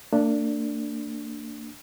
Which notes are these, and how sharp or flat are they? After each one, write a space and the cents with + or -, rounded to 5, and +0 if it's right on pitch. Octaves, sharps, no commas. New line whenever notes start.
A#3 -45 D4 +0